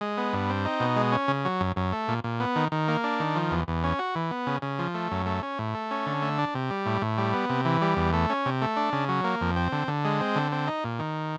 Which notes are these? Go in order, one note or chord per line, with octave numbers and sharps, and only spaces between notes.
G#3
B3
G2
C4
D#4
B2
G#3
C#4
C#3
F#3
F#2
F#2
A3
A#2
A#2
B3
D#3
D#3
A#3
D4
D#3
F3
E2
E2
C#4
F#4
E3
B3
C#3
C#3
F3
A3
F#2
A3
C#4
A2
A3
C#4
D3
A3
D4
C3
G3
A2
A2
G3
B3
C3
E3
G3
E2
A3
C#4
C3
A3
D4
C#3
F#3
A#3
F2
C4
D3
D3
G#3
C4
D3
C4
D#4
A#2
D#3